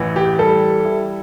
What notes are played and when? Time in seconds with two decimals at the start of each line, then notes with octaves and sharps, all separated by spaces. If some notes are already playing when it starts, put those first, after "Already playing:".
Already playing: A1 E3
0.16 G4
0.39 G3 A4
0.85 E4